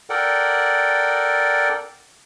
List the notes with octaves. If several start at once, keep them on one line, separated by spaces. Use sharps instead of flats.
A4 A#4 D5 F#5 G5